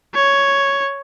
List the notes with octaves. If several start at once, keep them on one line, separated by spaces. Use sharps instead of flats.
C#5